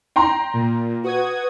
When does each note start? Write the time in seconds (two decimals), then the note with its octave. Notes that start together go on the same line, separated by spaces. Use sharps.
0.16 G5 A#5 C6
0.54 A#2
1.04 F#4 B4 D#6 G#6